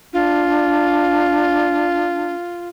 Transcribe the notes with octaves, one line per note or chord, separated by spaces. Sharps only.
D4 F4